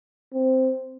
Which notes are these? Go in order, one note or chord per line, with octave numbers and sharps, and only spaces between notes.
C4